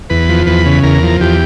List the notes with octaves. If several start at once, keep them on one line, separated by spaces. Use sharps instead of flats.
E2 B4
F3
E2 B4
C#3
E2 A#4
F3
E2 G4